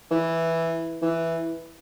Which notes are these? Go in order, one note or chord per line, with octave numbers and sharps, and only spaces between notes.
E3
E3